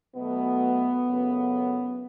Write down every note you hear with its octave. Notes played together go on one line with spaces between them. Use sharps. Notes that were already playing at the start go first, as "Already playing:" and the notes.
B2 F#3 A3 B3
F#2 C#3 F#3 A3